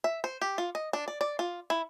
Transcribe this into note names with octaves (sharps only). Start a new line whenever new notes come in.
E5
C5
G4
F4
D#5
D4
D5
D5
F4
E4